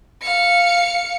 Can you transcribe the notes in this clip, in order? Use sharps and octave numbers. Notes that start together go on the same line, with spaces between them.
F5 C#7